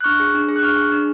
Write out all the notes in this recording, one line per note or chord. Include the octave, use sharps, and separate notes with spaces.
F#6
D4 C#6 F6
G#4
D4
G#4
F#6
D4 C#6 F6
G#4
D4